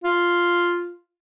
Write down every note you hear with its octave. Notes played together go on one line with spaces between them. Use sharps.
F4